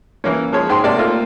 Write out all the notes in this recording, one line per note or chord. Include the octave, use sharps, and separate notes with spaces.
E3 A#3 C#4
F3 G#3 C#5
G#2 G#3 G5 C6
G#2 C3 A#3 D5 A5
A3 A#3 F4 A4